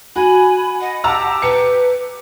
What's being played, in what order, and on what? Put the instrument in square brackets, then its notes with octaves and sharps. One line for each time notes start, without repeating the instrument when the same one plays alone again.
[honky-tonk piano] F#4 [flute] G#5 [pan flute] B5
[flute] D#5 [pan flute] F#5
[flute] G4 [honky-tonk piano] A5 A#5 E6
[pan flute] B4 [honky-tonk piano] C#7